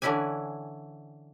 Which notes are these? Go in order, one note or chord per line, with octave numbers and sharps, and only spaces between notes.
D3 E3 C#4 E4 D5 G#5